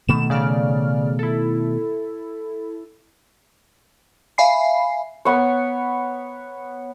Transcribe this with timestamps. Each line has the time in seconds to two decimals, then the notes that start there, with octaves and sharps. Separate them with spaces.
0.09 B2 D#3 A3 E7
0.30 C#3 D5 F6
1.19 E4 A4
4.38 E5 F5 G#5 B5 C7
5.25 B3 C#5